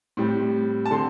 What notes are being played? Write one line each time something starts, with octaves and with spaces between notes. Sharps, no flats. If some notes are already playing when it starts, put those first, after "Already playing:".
A2 G3 C4
A5
D3 C4 C6